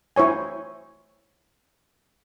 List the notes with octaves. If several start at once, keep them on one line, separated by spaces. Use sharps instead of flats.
E4 C5 C#5 G#5